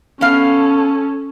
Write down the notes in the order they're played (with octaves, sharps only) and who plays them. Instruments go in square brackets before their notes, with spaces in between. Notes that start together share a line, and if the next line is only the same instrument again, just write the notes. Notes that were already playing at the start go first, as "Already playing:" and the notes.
[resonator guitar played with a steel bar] B3 F5 [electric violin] C#4 A4